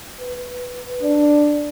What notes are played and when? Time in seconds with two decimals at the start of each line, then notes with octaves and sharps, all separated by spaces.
0.20 B4
1.02 D4